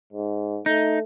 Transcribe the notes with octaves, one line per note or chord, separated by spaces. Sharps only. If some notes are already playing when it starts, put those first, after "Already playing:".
G#2
A3 D#4